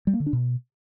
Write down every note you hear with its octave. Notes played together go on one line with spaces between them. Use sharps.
G3
A#3
D3
D4
B2